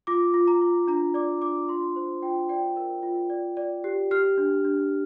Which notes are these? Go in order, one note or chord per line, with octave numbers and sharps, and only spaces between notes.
F4 D6
F4
A#5
F4
D4 A#5
D5 D6
D4 D6
F4 C6
C5
F4 G5
D5 G5
A#4
F4
D5
D5
G4
G4 F6
D4
D4